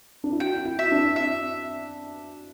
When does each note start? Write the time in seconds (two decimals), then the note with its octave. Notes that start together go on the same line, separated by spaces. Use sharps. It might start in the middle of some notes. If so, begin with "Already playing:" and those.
0.24 D4
0.32 E4
0.40 F#4 G5
0.54 F#4
0.65 E4
0.79 E5
0.92 D4
1.16 E5